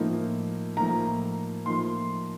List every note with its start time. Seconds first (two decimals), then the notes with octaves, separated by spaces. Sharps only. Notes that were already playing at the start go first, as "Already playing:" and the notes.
Already playing: A2 F3 A#3 D#4
0.76 A2 F3 A#3 D#4 A#5
1.66 A2 F3 A#3 D#4 C6